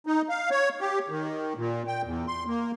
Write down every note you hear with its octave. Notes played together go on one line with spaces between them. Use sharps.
D#4
F5
C#5
G4
D#3
A#2
G5
E2
C6
A#3